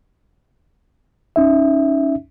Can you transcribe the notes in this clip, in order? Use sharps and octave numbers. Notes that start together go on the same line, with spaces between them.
C#4 D#4 E5